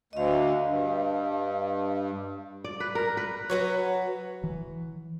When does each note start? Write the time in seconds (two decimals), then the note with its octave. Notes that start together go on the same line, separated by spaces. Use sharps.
0.13 D2 D#5 F5
0.69 G2
2.64 D5
2.80 B4
2.95 A#4
3.17 B4
3.50 F#3 F#4 B4 C#5
4.44 E3